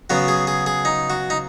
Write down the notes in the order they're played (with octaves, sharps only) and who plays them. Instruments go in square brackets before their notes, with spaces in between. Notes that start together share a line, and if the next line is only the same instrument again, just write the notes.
[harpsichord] C#3 F#3 B3 F#4
G#4
G#4
G#4
D#4
F#4
D#4